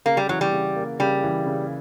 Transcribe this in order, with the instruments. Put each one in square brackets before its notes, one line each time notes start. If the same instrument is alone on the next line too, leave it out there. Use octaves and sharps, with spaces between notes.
[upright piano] C#3 [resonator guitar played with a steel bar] A#3
[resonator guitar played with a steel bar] G3
[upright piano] E3 [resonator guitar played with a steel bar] F#3
[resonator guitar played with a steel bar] G3
[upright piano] C#3
A#3
[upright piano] C#3 [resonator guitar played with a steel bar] G3
[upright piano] E3
C#3